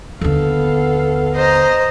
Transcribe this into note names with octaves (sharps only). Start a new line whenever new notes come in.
D#2 D3 B3 A4 F5
C5 D#5 A#5